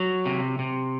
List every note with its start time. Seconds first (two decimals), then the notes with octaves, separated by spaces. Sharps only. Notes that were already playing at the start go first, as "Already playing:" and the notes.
Already playing: F#3
0.26 C3
0.59 C3